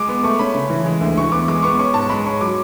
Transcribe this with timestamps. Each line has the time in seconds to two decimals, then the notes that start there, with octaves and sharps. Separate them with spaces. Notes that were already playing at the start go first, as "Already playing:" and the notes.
Already playing: G#3 D6
0.08 B3
0.23 A3 C#6
0.39 C#4 B5
0.54 C#3
0.70 E3
0.86 G#3
1.01 D2
1.17 E3 C#6
1.32 B3 D6
1.48 G#3 D6
1.63 B3 C#6
1.79 C#4 C#6
1.94 G#2 A5
2.09 G#3 B5
2.26 C#4 C#6
2.41 F#3 D6